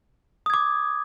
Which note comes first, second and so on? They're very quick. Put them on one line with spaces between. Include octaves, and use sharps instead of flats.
D#6 G#6 D6